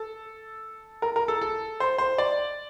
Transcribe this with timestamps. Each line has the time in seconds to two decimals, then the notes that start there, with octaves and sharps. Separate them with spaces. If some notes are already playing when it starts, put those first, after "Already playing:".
Already playing: A4
1.02 A#4
1.16 A#4
1.28 A4
1.41 A4
1.80 C5
1.98 C5
2.18 D5